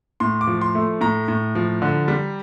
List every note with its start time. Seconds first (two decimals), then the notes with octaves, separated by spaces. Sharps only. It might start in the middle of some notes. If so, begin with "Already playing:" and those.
0.20 A2 C6
0.41 D6
0.47 F3
0.61 C6
0.75 A3
1.01 A2 A#5
1.28 A2
1.55 F3
1.82 D3
2.08 G3